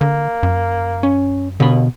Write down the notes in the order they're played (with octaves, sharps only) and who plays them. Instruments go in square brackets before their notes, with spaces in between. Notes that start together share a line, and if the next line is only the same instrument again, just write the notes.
[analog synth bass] D3 [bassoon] A#3
[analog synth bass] F#2
[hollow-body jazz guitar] C#4
[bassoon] D#2 [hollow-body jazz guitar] B2 B5 [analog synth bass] D3